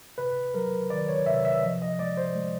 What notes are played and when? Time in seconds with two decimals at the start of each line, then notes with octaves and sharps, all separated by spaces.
0.18 C3 B4
0.54 F#3 A#4
0.90 D#3 D5
1.08 C#5
1.26 C3 E5
1.45 E5
1.63 F3 D#5
1.82 D#5
1.99 G#3 D5
2.17 C5
2.35 G#3